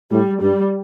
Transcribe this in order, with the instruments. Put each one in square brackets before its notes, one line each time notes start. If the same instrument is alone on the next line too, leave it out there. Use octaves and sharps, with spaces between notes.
[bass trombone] A2 [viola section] G3
[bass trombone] G2 [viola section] G3